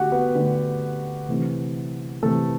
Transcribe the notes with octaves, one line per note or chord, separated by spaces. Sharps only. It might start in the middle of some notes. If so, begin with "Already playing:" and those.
Already playing: D3 A3 F#4 G4 F#5
B3 B4
D3 A3
C3 E3 A3
C3 E3 A3 A4